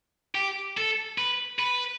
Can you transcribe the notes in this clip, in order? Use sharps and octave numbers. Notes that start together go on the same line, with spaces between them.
G4
A4
B4
B4